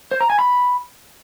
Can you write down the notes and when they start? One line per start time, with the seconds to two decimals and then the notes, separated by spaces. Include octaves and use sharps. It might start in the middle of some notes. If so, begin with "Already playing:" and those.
0.11 C5
0.21 A#5
0.30 G#5
0.39 B5